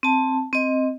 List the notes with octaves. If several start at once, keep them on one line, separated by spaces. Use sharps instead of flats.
C4 A5
C4 D#5